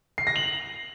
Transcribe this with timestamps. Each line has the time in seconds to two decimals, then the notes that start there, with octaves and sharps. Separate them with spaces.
0.18 C7
0.27 A#6
0.36 F#7